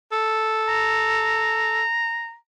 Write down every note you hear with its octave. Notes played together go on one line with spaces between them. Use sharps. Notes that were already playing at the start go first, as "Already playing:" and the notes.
A4
A#5